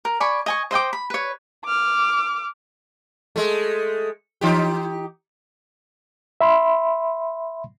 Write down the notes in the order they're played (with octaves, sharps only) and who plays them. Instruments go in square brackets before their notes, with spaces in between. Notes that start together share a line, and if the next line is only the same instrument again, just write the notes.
[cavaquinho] A#4
D5 G#5 B5 C#6
D#5 G#5 C#6
C5 D#5 G5 D6
B5
B4 C#5
[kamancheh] D6 F6
[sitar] G#3 A3
E3 D#4 G4
[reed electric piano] E5 B5 C6